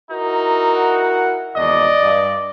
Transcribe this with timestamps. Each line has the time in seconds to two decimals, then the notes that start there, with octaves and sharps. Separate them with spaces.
0.10 D#4 E4 F#4 A#4
0.74 F#5
1.56 G#1 E2 D5 D#5
2.01 G2